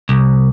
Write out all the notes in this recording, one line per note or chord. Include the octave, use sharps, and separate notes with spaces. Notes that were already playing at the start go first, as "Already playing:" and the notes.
C2